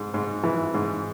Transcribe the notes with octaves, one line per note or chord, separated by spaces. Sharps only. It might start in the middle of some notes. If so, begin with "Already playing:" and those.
Already playing: G#2
G#2
E3
G#2